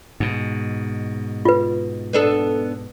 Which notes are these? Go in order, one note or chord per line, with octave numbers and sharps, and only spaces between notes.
G#2 B2
F4 B4
B3 D4 A4